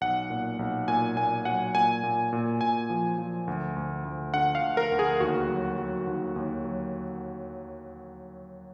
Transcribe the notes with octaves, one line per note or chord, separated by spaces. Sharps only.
B1 F#5
A#2
B1
A#2 G#5
A#2 G#5
F#3 F#5
A#2 G#5
A#2
A#2
A#2 G#5
F3
F3
D2
D2
D2
D3 F#5
F5
D2
A#4
D2
G#4
D#2 F#4
F#3
F#3
D#2
D#2
F#3